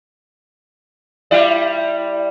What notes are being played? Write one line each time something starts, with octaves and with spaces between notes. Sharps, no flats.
G3 E4 D5